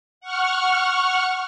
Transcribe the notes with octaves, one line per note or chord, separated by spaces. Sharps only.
F#5 C#6 F6